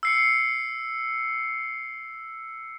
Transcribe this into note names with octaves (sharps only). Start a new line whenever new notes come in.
E6 C7 C#7